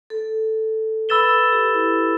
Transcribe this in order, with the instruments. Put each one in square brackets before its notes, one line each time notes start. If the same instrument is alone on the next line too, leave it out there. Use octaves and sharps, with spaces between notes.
[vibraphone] A4
[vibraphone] B4 [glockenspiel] B5 E6 A6 E7 G7
[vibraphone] A4
G4
E4